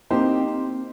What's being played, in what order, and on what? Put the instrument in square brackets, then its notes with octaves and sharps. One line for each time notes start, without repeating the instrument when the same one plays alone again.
[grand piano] A#3 D#4 G4 C5 [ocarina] C4
[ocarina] C4